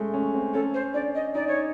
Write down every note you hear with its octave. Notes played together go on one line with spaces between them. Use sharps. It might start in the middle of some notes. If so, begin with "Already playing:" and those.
Already playing: G#3 A3 C#4
C#4
C4
C#4 A4
C5
D4 D5
D#5
D#4 D5
C#5